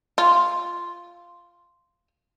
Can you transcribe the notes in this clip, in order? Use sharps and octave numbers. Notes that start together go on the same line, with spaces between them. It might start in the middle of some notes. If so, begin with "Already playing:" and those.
F4